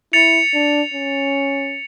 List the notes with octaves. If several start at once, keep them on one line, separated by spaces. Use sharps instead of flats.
E4 A6 C#7 F7
D4
C#4